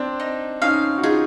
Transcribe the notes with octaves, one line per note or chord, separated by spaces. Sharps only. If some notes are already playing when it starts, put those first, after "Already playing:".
Already playing: C4 D4
D#4
C#4 D#4 F5
F#4
D#4 F4 G#4